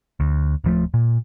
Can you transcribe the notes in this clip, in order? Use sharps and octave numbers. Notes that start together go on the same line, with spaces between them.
D2
D1 F3 A3
A#2